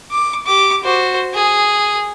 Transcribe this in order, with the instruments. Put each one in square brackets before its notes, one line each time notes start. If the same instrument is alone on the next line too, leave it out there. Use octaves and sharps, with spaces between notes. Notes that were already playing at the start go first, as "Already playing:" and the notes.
[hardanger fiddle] D6
G4 D6
F#4 C5
G#4